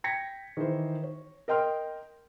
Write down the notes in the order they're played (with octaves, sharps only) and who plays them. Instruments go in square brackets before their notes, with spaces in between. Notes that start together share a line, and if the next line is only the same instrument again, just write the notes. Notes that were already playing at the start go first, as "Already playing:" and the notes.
[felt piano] G5 G#6 A#6 B6 C#7
D#3 E3 C5
C#5
A#4 D#5 G5 C6 F6